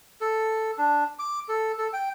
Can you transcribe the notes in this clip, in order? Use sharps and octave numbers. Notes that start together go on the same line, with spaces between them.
A4
D4
D6
A4
A4
G5